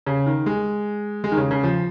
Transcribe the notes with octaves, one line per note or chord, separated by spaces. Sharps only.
C#3
D#3
G#3
G#3
D#3
C#3
C#3
F3